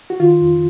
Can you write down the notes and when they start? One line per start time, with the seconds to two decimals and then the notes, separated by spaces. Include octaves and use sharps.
0.10 F#4
0.19 D#3 F4
0.41 F2